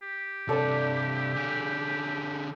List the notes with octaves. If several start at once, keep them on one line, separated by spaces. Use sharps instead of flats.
G4
C3 D4 A4 D5 A5
D3 G#4